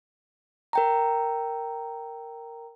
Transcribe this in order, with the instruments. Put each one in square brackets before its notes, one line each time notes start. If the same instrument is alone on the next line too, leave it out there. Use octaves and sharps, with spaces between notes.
[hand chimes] A#4 G5 A#5